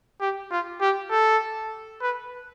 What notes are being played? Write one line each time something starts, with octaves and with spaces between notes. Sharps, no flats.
G4
F4
G4
A4
B4